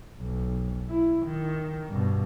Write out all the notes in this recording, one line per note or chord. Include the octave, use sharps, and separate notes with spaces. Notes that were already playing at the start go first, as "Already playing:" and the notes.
B1
E4
D#3
G2 B2